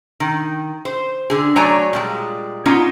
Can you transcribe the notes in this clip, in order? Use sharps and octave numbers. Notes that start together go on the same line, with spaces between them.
D#3
C5
D3 G#4
F#3 A3 C#5 D5 G#5 A#5
A#2 G3 G#3
A#3 B3 C#4 D#4 F4